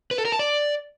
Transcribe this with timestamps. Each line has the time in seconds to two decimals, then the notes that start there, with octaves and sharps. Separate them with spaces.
0.11 B4
0.18 A4
0.25 A#4
0.32 A5
0.39 D5